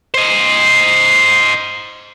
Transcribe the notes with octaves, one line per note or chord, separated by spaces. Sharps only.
C5 D#5